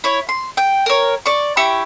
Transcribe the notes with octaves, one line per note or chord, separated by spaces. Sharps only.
E4 C#5
C6
G5
A#4 C#5
D5 C#6
E4 G4 C#6